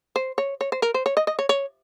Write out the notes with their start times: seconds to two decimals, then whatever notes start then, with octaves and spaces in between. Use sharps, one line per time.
0.16 C5
0.38 C#5
0.61 C#5
0.72 C5
0.82 A#4
0.94 C5
1.06 C#5
1.17 D#5
1.27 D#5
1.39 C#5
1.49 C#5